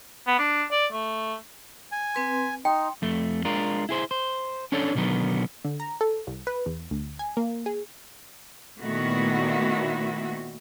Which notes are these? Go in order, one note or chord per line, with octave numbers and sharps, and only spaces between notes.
B3
D4
D5
A3
G#5
C4 B4 C6
D#4 G5 C6
F2 A3
G#3 D4 F4 A#4
E4 G#4 C5
C5
C#4 D4 A4 C#5 D5
B2 D3 D#3 F#3 B3
D3
A#5
A4
C2
B4
E2
D2
G#5
A#3
G#4
A#2 D#3 A3 B3 E4 F#4